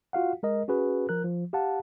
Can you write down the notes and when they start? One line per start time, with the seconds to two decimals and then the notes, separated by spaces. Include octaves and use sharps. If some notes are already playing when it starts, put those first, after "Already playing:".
0.13 F4 F#4 F5 F#5
0.43 G#3 A#4 D#5
0.68 C#4 F#4 G#4 B4
1.09 F3 A#4 F#6
1.24 F3
1.53 G4 F5 F#5 A5